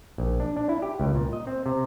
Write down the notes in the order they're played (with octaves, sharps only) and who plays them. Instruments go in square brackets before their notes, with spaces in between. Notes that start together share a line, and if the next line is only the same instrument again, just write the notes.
[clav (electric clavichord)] A#1
D4
D4
E4
G4
C#2
A#2
D#5
C4
C3